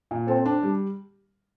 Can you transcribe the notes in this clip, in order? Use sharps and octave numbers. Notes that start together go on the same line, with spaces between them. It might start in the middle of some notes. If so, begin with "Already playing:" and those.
A#2
C4 A4
D4
G3